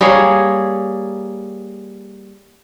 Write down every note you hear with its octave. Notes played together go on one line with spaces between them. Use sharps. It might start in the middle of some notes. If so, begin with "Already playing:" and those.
G3 A#3 G#4 C#5